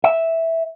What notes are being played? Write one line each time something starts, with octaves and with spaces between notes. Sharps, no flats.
E5